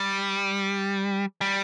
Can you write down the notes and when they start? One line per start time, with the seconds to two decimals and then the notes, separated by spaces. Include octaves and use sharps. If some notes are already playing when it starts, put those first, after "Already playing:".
Already playing: G3
1.41 G3